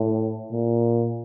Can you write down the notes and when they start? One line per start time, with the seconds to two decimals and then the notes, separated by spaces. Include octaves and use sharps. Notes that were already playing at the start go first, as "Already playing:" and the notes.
Already playing: A2
0.52 A#2